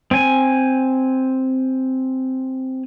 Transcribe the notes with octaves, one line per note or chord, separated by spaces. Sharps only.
C4 G#5